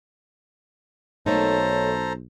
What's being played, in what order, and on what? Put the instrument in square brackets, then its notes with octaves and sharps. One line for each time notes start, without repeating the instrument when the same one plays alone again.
[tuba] B1 [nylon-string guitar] A3 A#3 D#4 [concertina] A4 C5 A#5 [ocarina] C#5